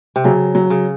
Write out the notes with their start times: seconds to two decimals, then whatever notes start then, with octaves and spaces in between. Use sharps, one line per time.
0.16 C3
0.24 C#3 F#3
0.55 F#3
0.70 C#3